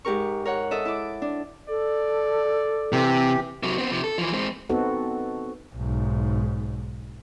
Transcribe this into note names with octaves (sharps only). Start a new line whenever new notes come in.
G#2 G4 A#4 C#6
A#4 C#5 F#5
A4 D#5 E5
E4 D6
D4
A4 D5
C3 E3 G4
C3 F#3
B3 C4
C3 F3
A4
E3 F3
G#3 C4
B3 C4 D#4 F#4 A4
B1 G#2